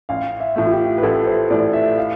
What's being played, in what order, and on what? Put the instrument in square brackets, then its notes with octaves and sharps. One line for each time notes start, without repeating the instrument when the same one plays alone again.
[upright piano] A1 [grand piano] F5
[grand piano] E5
[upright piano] A2 E3 A3
[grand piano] F4
G4
B4
[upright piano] A1 [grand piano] A4
[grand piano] C5
[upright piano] A2 E3 A3 [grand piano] D5
[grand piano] E5
F5